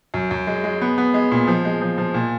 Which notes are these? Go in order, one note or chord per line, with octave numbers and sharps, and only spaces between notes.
F#2
F#2
G#3
G#3
B3
B3
G#3
A#2
F3
G#3
F3
F3
A#2